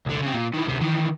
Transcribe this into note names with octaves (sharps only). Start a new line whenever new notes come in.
C2 D3
C#3 C4
A#2
D#3 E3
D2 C3
D#3 E3